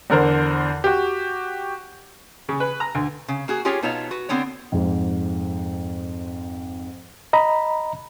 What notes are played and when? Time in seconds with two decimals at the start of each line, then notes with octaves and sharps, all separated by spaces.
0.10 E2 D3 A#4 C5
0.84 F#4 G4
2.49 C#3
2.60 B4
2.80 A#5
2.95 D2
3.28 C#3
3.48 A#3 F#4 G#4
3.65 C#4 F4 G4 G#4 C#5
3.82 B2 B3 D#4 F4 C#5 A5
4.11 F#4 B4
4.29 D3 B3 C4 D4 C#5
4.72 F2 G#2
7.33 D#5 A#5 B5